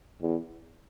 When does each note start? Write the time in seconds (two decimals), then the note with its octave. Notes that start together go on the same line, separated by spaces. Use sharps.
0.22 E2